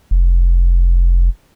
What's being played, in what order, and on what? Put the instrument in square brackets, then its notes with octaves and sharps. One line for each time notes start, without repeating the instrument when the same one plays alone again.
[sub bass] F1